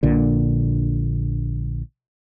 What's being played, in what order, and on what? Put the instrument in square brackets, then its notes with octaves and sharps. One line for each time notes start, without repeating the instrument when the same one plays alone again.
[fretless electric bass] A#1 A#2 D3